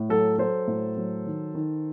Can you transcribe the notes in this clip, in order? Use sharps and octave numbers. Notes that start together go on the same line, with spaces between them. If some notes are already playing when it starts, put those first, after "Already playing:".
Already playing: A2
F#3 A4
F#3 A4 C5
A2
F#3
D#3
D#3